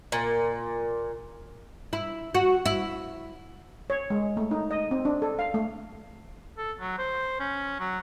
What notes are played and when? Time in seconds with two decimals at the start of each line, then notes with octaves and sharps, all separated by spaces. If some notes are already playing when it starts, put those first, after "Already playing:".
0.12 A#2
1.93 E4
2.35 F#4
2.66 E4
3.90 C#5
4.10 G#3
4.37 A3
4.51 D#4
4.71 D#5
4.91 C4
5.05 D4
5.22 A4
5.39 F5
5.54 A3
6.58 A4
6.80 F#3
6.98 C5
7.40 C#4
7.80 F#3